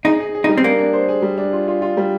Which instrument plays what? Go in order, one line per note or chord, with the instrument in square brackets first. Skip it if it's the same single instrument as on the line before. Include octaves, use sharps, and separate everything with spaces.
[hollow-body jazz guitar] D#4 [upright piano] G#4
[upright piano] G#4
G#4
[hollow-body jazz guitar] D#4
[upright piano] G3
[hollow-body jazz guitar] C4
[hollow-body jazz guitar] A#3 [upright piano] D4
[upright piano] D4
C5
G#4
G3
D4
F4
F4
F4
G3